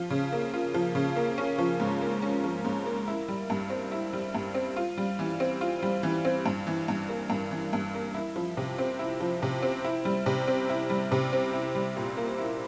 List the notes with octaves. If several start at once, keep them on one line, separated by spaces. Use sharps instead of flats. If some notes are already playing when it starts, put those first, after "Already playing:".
Already playing: F3 F4
C#3
A#3
F4
F3
C#3
A#3
C#4
F3
G#2
A#3
C#4
F3
G#2
A#3
E4
G3
G2
C4
E4
G3
G2
C4
F4
G3
E3
C4
F4
G3
E3
C4
G2
E3
G2
A#3
G2
E3
G2
A#3
E4
F3
C3
C4
E4
F3
C3
C4
E4
G3
C3
C4
E4
G3
C3
C4
E4
G3
A#2
A#3
E4